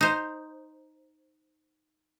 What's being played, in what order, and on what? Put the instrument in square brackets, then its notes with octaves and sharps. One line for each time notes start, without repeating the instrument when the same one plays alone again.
[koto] D#4 C5